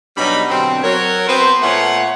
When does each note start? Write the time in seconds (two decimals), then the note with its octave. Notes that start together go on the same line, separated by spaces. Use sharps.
0.17 B2 F#3 G3 D4 D#4 B5
0.49 B2 D3 F#3 C4
0.82 F#3 A#4 C#5
1.28 B3 C4 B4 C5
1.62 A#2 A3 B3 F4 C#5 F#5